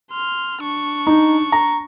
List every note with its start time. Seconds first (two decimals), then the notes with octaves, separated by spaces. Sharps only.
0.11 C6 F6
0.62 D4 C#6
1.07 D#4
1.52 A#5